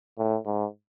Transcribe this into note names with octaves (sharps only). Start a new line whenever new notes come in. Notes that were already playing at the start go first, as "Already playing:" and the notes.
A2
G#2